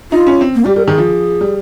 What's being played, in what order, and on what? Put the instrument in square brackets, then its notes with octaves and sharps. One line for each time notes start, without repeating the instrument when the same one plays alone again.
[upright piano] D#4 [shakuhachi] F4
[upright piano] C#4
C4
[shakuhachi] A#3
[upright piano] G3 [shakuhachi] G4
[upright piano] G3 [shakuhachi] A#4
[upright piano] D#3 [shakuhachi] G#4
[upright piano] F3
G3